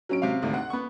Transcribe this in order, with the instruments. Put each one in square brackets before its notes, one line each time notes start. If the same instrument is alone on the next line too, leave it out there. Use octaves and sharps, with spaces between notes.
[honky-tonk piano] F#3 C#4 D7
[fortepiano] C3 F5
[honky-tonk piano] G#1 D2
F#5
[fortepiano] B3 C#6